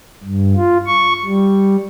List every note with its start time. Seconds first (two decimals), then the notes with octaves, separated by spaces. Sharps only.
0.24 G2
0.56 F4
0.87 C#6
1.26 G3